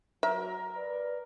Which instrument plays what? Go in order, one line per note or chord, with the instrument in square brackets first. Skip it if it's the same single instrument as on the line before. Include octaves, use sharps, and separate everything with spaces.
[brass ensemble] F#3 [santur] A#4 [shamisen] E5
[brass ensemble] B4 D5